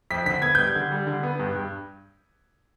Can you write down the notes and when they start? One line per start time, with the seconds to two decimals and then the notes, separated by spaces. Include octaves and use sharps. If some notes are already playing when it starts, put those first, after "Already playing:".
0.11 F2 B6
0.26 D3 B6
0.42 B3 G#6
0.55 G3 G6
0.67 G#6
0.75 D3
0.91 G3
1.07 D3
1.23 B3
1.40 G2
1.55 G2